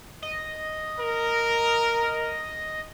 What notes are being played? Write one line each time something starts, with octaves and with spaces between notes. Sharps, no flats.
D#5
A#4